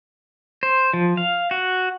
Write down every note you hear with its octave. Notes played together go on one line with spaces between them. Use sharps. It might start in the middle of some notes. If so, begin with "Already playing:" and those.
C5
F3
F5
F#4